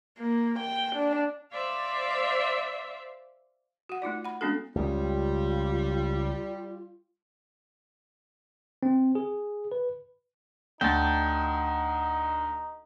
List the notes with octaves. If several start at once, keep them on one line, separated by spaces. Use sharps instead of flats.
A#3
G5
D4
C5 D5 E5 F5
F#4 F#5
A3 D#4 F4 D5
F#5 B5
G#3 B3 C#4 D4 F#4 A4
C#2 C#3 G3 F4
C4
G#4
B4
D2 D#4 G5 A5